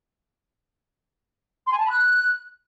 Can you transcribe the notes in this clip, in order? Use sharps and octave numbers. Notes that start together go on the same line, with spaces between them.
C6
G#5
A5
B5
F#6